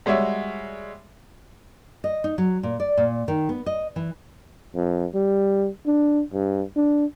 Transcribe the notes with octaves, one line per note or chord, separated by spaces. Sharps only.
G3 G#3 F#4 C#5 E5
D#5
D#4
F#3
A#2
D5
A#2
D#3
B3
D#5
E3
F2
G3
D4
G2
D4